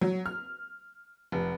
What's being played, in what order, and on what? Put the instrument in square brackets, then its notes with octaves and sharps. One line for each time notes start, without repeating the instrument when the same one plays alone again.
[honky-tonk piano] F#3
F6
F1